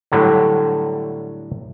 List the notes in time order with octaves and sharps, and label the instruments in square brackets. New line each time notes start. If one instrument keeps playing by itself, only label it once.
[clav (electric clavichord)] A2 D3 F#3 G3